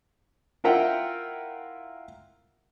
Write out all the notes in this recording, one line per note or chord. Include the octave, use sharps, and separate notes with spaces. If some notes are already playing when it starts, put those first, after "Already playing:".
E4 F4 A#4 E5 F#5 G5